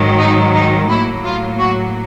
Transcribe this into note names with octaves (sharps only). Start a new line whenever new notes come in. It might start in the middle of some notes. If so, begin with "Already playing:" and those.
Already playing: G#2 D#3 F#3
D#4
D#4
A2 F#3 A#3 E4
F4
F#4